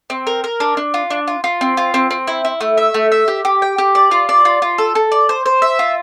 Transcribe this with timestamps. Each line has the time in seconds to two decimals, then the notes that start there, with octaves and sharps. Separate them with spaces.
0.10 C4
0.27 A#4
0.44 A#4
0.60 D4
0.77 D4
0.94 F4
1.10 D4
1.28 F4
1.44 F4
1.61 C4
1.77 F4
1.94 C4
2.11 C4
2.27 E4
2.45 E4
2.61 A3
2.78 E5
2.94 A3
3.12 E5
3.28 G4
3.45 G4
3.62 G5
3.78 G4
3.95 D5
4.11 F4
4.29 D5
4.45 F4
4.62 F4
4.78 A4
4.95 A4
5.12 D5
5.29 C5
5.46 C5
5.62 E5
5.79 F4